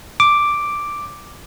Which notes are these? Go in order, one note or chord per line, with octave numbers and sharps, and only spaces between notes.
D6